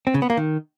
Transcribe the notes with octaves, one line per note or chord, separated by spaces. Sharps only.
C4
C#3
B3
A#3
D#3